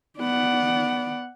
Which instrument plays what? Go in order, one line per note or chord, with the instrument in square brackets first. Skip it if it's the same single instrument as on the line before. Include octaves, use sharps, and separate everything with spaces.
[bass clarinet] B3 [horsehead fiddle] D5 F#5